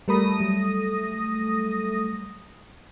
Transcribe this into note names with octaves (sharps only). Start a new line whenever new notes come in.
G3 A3 A#4 B5 D#6 A#6
F#3 G3